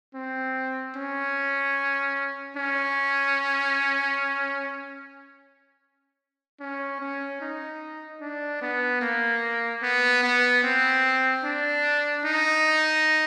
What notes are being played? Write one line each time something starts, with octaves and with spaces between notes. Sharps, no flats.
C4
C#4
C#4
C#4
C#4
D#4
D4
B3
A#3
B3
B3
C4
D4
D#4